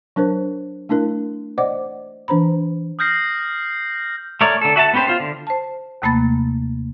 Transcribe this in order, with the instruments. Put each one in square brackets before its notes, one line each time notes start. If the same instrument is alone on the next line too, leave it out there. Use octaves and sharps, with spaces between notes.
[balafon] F#3 D4 A#4 C5
A3 D4 E4 A#4
C5 D5 D#5 F#5 D6
E3 D4 C5 A#5 B5
[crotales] D#6 F6 G6 A#6 C7
[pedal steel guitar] A3 A#4 C#5 D5
D3 A4
F#4 E5 G#5 A5
B3 C#4 G4 B4 C5
F4 C5
D3
[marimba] C5 A5
D#2 C3 A3 A#3 B5 A6